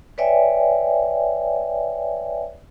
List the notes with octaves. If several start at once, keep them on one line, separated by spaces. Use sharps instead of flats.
B4 C#5 D5 E5 G5 G#5